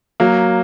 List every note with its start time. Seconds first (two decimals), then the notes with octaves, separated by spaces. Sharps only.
0.20 F#3 A#3